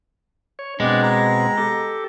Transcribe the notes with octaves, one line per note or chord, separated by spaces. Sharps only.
C#5
B2 G#3 B3 C4 D4
A#5
G4 A4